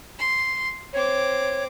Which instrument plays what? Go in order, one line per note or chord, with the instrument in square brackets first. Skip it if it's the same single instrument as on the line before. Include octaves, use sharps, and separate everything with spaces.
[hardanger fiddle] C6
[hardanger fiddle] C4 D6 [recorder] C#5